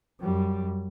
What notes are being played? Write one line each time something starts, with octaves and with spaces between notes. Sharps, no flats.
F#2 G3